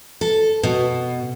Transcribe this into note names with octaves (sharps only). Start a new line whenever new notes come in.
A4
B2